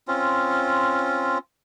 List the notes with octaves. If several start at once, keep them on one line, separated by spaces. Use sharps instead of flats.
C4 C#4 F4